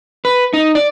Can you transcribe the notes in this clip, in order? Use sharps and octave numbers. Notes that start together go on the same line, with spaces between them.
B4
D#4
D5